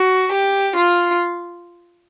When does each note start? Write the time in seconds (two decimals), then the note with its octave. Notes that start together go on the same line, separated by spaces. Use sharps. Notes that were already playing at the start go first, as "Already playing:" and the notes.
Already playing: F#4
0.32 G4
0.74 F4